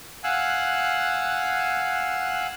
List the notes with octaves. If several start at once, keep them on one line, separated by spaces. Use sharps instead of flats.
F5 F#5 G#5 E6 F#6